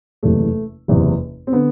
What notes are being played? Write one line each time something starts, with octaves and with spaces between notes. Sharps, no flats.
F#1 E2 C3 A3
F#1 E2 C3
C4
D3 B3